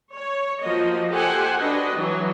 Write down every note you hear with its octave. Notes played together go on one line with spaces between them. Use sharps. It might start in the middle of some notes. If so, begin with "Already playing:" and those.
C#5
F3 A#3 F#4 D#5
G4 A4 C5 F#5 G#5
D4 F#4 B4 D#5
E3 F#3